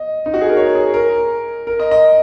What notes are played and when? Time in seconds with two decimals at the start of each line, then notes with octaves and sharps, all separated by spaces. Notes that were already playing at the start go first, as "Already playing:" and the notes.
Already playing: D#5
0.26 D#4
0.34 F#4
0.41 G#4
0.49 A#4
0.57 C#5
0.75 G#4
0.94 A#4
1.67 A#4
1.80 D#5
1.91 D#5